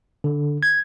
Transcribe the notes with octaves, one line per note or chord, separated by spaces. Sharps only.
D3
G#6